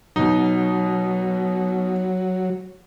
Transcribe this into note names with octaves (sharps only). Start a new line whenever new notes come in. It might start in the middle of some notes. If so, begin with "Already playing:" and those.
B2 F#3 D#4